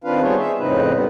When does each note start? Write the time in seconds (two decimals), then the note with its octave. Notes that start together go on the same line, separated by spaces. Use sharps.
0.04 D#3 C4 D4 F4 B4 F5
0.22 G3 B3 F4 G#4 C5 C#5
0.39 G#4 E5
0.59 F2 A2 C#3 C4 D#4 B4
0.93 G3 B3